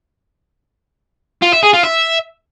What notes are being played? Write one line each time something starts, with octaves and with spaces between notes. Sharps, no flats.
F4
E5
G#4
F4
E5